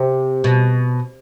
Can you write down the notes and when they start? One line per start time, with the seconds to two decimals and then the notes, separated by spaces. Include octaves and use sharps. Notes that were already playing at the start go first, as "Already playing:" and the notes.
Already playing: C3
0.44 B2